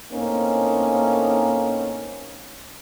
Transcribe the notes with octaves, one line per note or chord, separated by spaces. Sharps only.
A2 A#3 C4 C#4 D#4